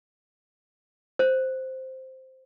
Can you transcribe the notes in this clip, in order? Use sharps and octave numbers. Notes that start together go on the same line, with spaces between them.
C5